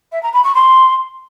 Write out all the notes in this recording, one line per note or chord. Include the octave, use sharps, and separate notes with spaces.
E5
A#5
B5
C#6
C6